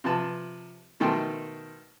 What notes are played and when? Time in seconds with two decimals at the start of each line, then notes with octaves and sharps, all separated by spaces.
0.04 C3 F3 B4 A5
1.00 B2 D#3 A3 G5 A5 C6